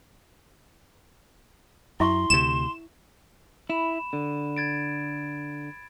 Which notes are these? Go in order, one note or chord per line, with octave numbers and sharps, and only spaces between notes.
F#2 E4 E5 C6 C#6
D2 C3 E7
E4 B5 E7
D3
G#6 A6 D7